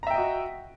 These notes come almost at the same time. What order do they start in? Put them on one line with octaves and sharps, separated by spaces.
A#5 E5 G5 D#5 F#4